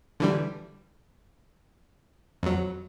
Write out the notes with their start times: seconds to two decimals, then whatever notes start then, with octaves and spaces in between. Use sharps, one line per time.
0.20 D3 E3 G3
2.43 F2 F#3